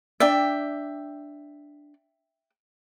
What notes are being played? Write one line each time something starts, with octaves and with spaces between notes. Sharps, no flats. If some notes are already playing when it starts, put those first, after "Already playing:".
D4 D5 E5 G5